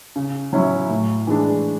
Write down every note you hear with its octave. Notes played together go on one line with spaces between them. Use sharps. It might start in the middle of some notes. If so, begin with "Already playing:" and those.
C#3
F#3 C#4 E4
A2
E3 G#3 D4